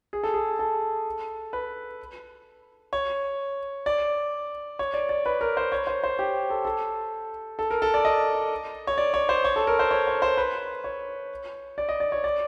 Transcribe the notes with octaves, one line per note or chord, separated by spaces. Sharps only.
G#4
A4
G#4
A4
B4
C#5
D5
C#5
D5
D5
B4
A#4
C5
C#5
C5
C5
G4
A4
A4
A4
A#4
A4
D5
D#5
C#5
D5
C#5
C5
C#5
A4
A#4
C5
C#5
C#5
C5
B4
C#5
D5
D#5
D5
C#5
D5